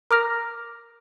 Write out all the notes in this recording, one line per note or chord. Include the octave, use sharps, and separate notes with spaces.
A#4 D6 F6 A#6